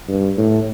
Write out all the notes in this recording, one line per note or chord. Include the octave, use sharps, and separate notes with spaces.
G2
A2